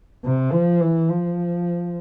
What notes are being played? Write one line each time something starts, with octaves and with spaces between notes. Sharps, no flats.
C3
F3
E3
F3